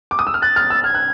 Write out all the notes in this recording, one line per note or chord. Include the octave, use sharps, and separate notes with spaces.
D6
D#6
E6
F6
F#6 A6
F6
E6
F6 G#6
F#6